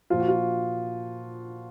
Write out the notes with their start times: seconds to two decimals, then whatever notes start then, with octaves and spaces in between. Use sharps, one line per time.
0.10 A#2 F3 F4
0.20 F#4
0.28 F4